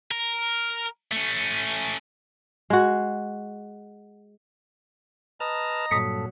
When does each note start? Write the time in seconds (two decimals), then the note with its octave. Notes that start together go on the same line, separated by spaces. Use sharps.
0.11 A#4
1.12 A3 C#4
2.70 G#3 F#4
5.40 B4 D#5 A5 A#5 F6
5.91 G2 A#2 F#3 A4 D#6 B6 C#7